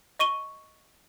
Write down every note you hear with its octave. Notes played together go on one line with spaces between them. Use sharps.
D#5 C#6 D#7 G7